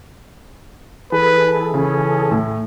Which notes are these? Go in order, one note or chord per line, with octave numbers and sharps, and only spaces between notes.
E3 G#4 A4 B4
C#3 C#4
A2